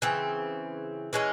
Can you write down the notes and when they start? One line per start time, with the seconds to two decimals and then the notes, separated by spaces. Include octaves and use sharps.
0.02 C#3 E3 C4
1.13 E3 G#3 C#4